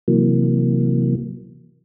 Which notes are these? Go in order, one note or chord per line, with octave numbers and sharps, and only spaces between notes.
C3 E3 F#3 A#3